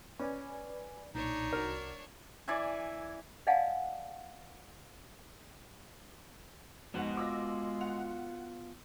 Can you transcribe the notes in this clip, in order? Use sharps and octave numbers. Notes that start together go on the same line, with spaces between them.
C#4 B4 D5 G#5
B1 A#2 D4 D#4 C#5
C2 F#4 A#4
E3 D5 E5 G#5
D5 D#5 F5 F#5 G#5 A5
F2 G#2 G#3 B3 F#4 F#5
F4 D6 E6 A#6
F#5 F7